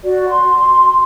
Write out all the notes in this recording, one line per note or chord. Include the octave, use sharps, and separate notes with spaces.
F#4 D5
C6